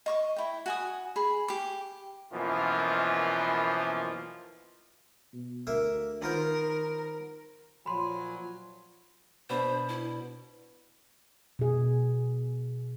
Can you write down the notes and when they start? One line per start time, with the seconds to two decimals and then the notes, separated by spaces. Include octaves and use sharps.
0.06 D#5 C#6 D6
0.36 E4 G5
0.66 F#4 G#5 D#6
1.16 G#4 B5
1.48 G4 D6
2.33 F#2 B2 E3 F3 A#3 F4
5.33 B2
5.67 D2 A#3 A#4 E5
6.22 D#3 B3 F4 A#4 C5
7.86 A#2 F3 F#3 G#5 B5 C6
9.50 B2 D4 C5 B5
9.89 E4
11.59 B2 G#4